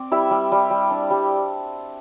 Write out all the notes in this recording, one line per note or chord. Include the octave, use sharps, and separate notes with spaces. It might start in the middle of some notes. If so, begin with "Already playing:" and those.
Already playing: C4 D5
G3 E4 E5
G3
G3
G3
D4
G3